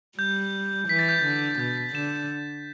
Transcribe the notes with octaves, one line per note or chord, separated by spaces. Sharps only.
G3 G6
E3 B6
A6
G6
A6
D3
B2 G6
B6
D3 E7